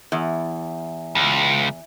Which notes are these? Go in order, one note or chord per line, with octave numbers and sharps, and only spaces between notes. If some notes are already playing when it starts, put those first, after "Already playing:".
E2
C#2